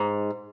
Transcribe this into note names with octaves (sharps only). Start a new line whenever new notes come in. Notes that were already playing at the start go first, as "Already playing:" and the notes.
Already playing: G#2